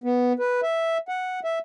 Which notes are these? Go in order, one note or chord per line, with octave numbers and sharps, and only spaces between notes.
B3
B4
E5
F#5
E5